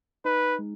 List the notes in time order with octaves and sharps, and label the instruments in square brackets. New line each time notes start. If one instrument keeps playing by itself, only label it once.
[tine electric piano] D#4 [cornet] B4
[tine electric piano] G#3